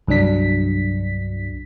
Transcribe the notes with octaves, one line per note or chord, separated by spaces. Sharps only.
C2 G2 F#3 D4 B6